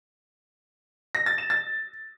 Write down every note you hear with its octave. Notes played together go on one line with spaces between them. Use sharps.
A#6
A6
E7
A6